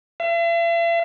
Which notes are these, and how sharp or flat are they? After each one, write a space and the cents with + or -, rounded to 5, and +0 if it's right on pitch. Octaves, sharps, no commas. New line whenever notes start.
E5 +45